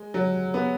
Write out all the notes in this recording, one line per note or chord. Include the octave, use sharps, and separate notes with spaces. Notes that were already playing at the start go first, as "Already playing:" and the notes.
Already playing: G#3
F#3
B3